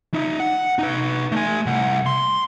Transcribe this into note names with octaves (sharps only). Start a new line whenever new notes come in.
D#4 E5
F#5
D#4 B4
A3 G#5
C2 F#5
C6